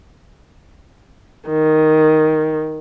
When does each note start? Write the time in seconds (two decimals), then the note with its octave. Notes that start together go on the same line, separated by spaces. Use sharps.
1.49 D#3